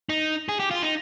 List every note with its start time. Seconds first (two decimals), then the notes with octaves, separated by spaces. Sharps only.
0.09 D#4
0.49 G#4
0.60 G4
0.71 F4
0.82 D#4